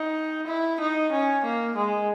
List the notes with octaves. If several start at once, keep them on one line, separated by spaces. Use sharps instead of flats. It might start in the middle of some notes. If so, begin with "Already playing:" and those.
Already playing: D#4
E4
D#4
C#4
A#3
G#3